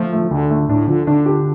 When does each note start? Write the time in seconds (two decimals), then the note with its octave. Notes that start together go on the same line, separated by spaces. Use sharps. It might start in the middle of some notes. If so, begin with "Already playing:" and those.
Already playing: F3 A3
0.13 A3
0.31 D2 D3
0.50 A3
0.69 A2 D4
0.87 D3 F3
1.07 D3 D4
1.26 G4